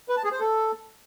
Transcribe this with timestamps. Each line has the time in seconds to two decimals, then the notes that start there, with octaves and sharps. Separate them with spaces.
0.09 B4
0.17 A5
0.24 G#4
0.32 C5
0.40 A4